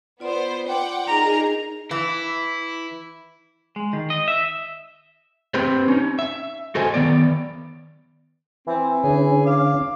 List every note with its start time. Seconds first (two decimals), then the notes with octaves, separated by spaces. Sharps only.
0.20 B3 F4 C5 D5 C6
0.67 F#5 G5 D6
1.07 D#4 G#4 A#4 A#5
1.91 E3 E4
3.76 G#3
3.93 D#3
4.10 D#5
4.28 E5
5.54 C4 G4 B4 C5
5.88 C#4 D#4
6.19 E5
6.75 F#4 A4 C5 D#5 G#5
6.94 D#3 B3 D5
8.68 E3 C4
9.04 D3 C#4 G#4
9.46 F5 D6